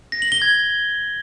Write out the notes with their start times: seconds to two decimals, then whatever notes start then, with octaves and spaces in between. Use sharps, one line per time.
0.12 A#6
0.22 F#7
0.32 G7
0.42 G#6